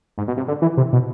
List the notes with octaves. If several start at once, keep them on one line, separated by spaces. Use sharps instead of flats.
G#2
B2
C3
D3
E3
C3
B2